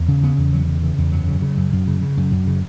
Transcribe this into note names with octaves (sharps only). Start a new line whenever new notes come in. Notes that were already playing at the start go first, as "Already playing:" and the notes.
Already playing: E2
C#3
C#3 B3
E2
E2 F#3
C#3
C#3 E3
E2
F#2 F#3
C#3
C#3
F#2
F#2
C#3
C#3
F#2
F#2
C#3